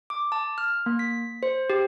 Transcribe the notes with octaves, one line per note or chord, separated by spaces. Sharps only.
D6
A5
F6
A#3
B6
C5
G4